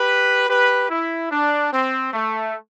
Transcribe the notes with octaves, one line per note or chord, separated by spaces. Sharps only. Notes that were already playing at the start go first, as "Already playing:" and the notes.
Already playing: G4 B4
G4 B4
E4
D4
C4
A3